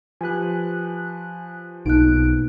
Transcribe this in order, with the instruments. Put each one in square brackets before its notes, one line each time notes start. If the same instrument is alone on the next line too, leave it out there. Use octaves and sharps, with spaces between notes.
[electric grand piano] F3 G4 B4 [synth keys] G#5 F#6
[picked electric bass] B1 [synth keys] B2 A#3 D7 [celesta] D#4 F#6